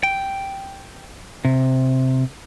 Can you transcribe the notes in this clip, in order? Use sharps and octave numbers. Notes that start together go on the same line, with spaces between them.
G5
C3